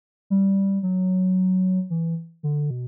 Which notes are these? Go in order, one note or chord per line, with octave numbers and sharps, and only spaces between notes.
G3
F#3
E3
D3
B2